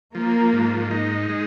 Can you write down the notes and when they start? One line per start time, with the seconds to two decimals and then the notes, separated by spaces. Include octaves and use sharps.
0.15 F3 A#3
0.53 G#2
0.91 D#4
1.29 G#3